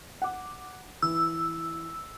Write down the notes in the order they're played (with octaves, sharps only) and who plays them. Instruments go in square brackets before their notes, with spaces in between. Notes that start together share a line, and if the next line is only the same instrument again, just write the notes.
[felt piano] F#5 D6
[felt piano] E3 [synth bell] E6